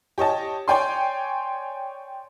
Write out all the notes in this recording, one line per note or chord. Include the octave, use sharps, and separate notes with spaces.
G4 C#5 D#5 A5
C#5 D5 G5 G#5 C6